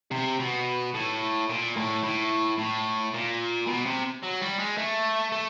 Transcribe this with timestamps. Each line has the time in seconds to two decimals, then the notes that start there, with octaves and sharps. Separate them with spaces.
0.11 C3
0.39 B2
0.94 A2
1.49 A#2
1.76 A2
2.04 A2
2.58 A2
3.14 A#2
3.67 B2
3.86 C3
4.23 F#3
4.41 G3
4.59 G#3
4.77 A3
5.32 A3